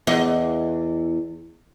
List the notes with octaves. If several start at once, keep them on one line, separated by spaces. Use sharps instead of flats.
E2 D#5